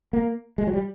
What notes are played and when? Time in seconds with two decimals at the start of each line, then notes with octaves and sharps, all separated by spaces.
0.13 A#3
0.58 G#3
0.67 F#3
0.73 G3